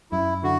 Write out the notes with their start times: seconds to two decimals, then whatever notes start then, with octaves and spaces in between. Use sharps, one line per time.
0.12 F#2 E4
0.43 D3 F#4